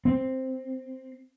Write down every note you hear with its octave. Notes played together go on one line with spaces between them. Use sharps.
C4